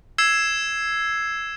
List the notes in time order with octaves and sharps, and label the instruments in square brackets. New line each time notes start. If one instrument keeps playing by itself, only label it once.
[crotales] E6 G#6 C7 E7